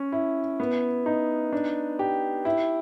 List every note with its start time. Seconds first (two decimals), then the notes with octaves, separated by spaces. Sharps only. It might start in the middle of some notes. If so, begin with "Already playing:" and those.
Already playing: C#4
0.12 E4
0.60 B3
1.06 D#4
1.53 D4
1.99 G4
2.45 E4